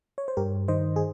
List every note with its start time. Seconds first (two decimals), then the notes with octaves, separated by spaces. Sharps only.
0.18 C#5
0.28 C5
0.37 G2 G4 A#4
0.68 D#3 C5 D#5
0.96 G#4